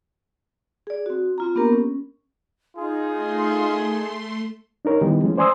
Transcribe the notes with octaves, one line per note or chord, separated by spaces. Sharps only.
G#4 D5
C4 F#4
C4 F4 A#5
A#3 B3 D4 G4 A#4
C#4
D#4 F4 G#4
A3 C6
D4 D#4 A#4 C#5
D#3 E3 G3 B3 D#4 G4
E3 F3 G#3 A3 C#4
C5 D5 G#5 C6 D#6 E6